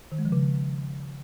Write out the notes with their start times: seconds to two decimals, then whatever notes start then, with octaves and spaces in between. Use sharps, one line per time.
0.12 D#3
0.19 G#3
0.25 F3
0.32 C#3